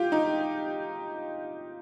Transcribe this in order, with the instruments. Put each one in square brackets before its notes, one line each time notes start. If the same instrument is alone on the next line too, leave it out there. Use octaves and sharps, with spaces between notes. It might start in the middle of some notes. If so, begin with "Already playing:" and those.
Already playing: [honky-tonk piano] F4 G4
D#4